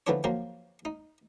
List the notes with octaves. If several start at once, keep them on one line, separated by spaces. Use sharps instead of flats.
D3 E3 F3 B3 D4 C#5
F3 F#3 A#3 F4
D#4